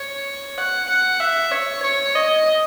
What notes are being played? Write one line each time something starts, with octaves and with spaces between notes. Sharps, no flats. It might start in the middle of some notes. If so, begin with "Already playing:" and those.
Already playing: C#5
F#5
F#5
E5
C#5
C#5
D#5